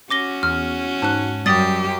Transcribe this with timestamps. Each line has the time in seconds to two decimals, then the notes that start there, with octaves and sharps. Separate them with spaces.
0.10 C#4 F#4 D6 A#6 G7
0.43 E2 F6
1.02 G#2 A5 F#6
1.46 F#2 G3 G4 D#6 A6